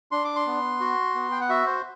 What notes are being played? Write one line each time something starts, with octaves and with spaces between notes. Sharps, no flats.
D4 C6
D6
C6
B3
F#4
B3
G5
F#5
F#4 E5
C5